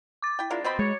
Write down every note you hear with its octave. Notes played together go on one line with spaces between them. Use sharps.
D6 A6
E4 G5
G#3 D4 E4 F4 A#4
F2 B2 C4 D#5 B5
F#3 G#3 C#5